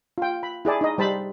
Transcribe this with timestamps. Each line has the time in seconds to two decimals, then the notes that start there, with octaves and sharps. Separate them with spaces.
0.18 F4 G5
0.43 B5
0.65 E4 G#4 D5 A5
0.81 D#4 D#5
0.98 G3 C5 A5 B5